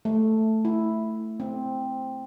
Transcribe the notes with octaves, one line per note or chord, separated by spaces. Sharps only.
A3
E4
C4